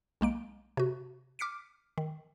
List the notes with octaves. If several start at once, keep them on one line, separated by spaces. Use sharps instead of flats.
B1 G#3 A#3 D7
C3 F#4
D6 F6 B6 C#7 D7
D#3